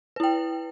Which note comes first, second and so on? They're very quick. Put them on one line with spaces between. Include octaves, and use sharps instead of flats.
B4 E4 G5